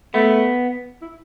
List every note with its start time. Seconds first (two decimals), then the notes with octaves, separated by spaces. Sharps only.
0.14 A3 B3
1.02 E4